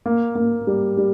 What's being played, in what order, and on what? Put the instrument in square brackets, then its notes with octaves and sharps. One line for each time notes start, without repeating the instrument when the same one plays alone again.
[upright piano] A#3
A#3
G3
G3